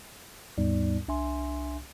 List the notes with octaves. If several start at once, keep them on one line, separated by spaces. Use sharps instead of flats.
D#2 G#2 G3 B3 D#4 D5
C2 D4 E5 G#5 C6